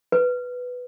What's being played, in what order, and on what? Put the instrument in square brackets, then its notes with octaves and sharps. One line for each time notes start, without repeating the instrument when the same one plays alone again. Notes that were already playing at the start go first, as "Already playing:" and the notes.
[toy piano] B4